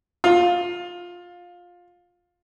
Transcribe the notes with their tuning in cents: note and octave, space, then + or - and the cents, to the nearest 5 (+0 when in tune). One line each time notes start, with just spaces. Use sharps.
F4 +15